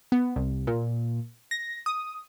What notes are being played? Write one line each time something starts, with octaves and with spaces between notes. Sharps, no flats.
B3
C2
A#2
A#6
D#6